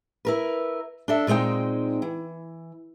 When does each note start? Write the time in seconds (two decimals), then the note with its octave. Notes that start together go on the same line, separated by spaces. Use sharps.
0.25 E4 A#4 B4
1.08 D4 A4 E5
1.27 A#2 G#3 C4 D#4 G5
2.02 E3